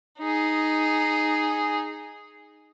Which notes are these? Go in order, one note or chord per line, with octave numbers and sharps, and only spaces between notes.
D#4 G#4